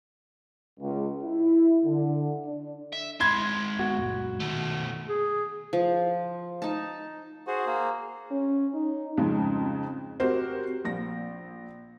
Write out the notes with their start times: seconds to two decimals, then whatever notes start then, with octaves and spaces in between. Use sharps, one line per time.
0.80 C#2
1.22 E4
1.84 D3
2.46 D4
2.93 E5
3.20 G#3 C4 B5 C6 G#6
3.79 B3 F#4
3.98 F#2 A#2 G#3
4.40 B2 D#3 A3
5.09 G#4
5.73 F3
6.62 D#4 A5
7.47 F#4 G#4 C5
7.66 A#3
8.31 C#4
8.74 D#4
9.17 F2 G#2 C#3
10.20 C4 F#4 G4 A#4 C5
10.85 A#1 A#6